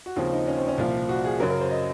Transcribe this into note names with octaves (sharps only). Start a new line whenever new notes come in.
F#4
D#2 C#3 F3 C4 F4
D#4
C#4
C4
C#4
C2 A#2 F3 F4
F#4
G#4
F#2 C#3 F#3 A#4
A#4
C5
D#5